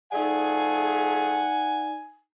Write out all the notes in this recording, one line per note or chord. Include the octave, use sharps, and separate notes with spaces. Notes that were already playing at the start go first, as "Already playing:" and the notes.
F3 A3 D#4 G#4 D5 F#5 G#5